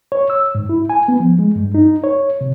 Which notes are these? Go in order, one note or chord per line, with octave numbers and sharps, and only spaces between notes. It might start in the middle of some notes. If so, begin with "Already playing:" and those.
C#5
E6
G#2
E4
G#5
B3
F3
G#3
G2
D#4
C#5
C3